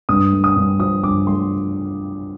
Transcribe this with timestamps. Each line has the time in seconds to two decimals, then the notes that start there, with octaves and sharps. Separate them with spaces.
0.09 G2 D#6
0.32 A3
0.44 D#6
0.56 G2
0.80 F3 D#6
1.03 G2 D6
1.27 A3 C6